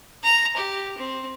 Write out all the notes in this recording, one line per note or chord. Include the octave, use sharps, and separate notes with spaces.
A#5
G4
C4